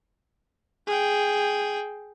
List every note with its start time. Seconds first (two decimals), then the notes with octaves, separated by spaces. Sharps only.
0.87 G#4 G5